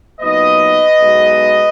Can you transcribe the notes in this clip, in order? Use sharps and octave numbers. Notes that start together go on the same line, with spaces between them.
A#2 F#3 B3 D#4 B4 D#5
B1 B2 G#3